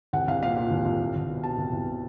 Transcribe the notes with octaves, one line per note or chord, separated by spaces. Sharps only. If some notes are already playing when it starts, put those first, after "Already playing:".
C2 F#5
C2 F5
A#2 F5
A#2
C2
C2
C2
C2
B2
B2 A5
C2
C2